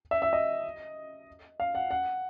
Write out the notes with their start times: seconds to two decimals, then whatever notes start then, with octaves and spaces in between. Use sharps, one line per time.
0.11 E5
0.22 E5
0.33 D#5
1.60 F5
1.75 F#5
1.91 F#5